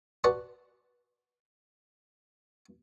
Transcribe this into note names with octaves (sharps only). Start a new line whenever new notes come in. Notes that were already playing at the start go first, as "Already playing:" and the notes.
F#4 B4 D5 F#5 A5 C6